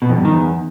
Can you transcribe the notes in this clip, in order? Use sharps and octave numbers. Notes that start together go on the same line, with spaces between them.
B2
F2
G2
D#3
E2